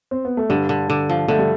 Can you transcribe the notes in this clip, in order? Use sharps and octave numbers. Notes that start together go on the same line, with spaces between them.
C4
B3
A3
G2 D3 G3
D3
D3
F3
D3 A3
G3